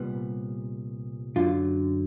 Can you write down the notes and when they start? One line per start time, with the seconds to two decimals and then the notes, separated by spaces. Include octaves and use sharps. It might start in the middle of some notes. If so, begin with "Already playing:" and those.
Already playing: C2 A#2 G3 B3
1.36 F#2 D3 F#3 F4